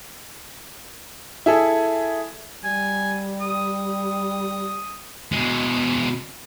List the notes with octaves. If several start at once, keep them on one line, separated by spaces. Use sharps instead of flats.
E4 G#4 A4
G3 G#5
D#6
B2 G#3